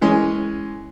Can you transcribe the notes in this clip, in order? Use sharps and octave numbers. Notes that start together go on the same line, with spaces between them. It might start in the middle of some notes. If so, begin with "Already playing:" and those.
E3 G#3 C#4